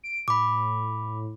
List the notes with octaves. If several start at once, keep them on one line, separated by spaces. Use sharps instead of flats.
D7
A2 B5 D6